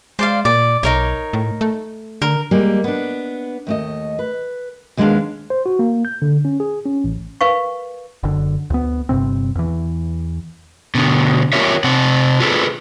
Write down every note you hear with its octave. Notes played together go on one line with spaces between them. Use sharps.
G#3 C5 D5 F5
A#2 D5
B1 D#4 A#4 C#5
A2
A3
D3 A#4
G3 G#3 A#3
B3 D4
D#2 A3 D#5
B4
D#2 D3 G#3 B3 D4 F5
C5
F#4
A#3
G6
D3
C#4
G#4
C#4
A1
A#4 B4 F5 C#6
F#1 D3
D2 B3
G1 G2 C3 C4
E2 E3
B2 D3
F4 G4 A#4 C#5 E5
C3 C4 F#5
F4 G#4 A4 B4